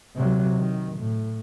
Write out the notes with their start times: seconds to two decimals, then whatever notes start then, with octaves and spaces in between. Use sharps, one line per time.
0.16 C3 F#3
0.59 D#3
0.97 A2